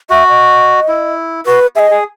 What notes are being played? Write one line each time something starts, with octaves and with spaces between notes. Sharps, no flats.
F#4 E5
D#5
E4
F#4 B4
G#4 D#5 E5
G#4